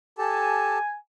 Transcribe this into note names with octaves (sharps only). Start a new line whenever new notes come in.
G4 A4 G#5 A5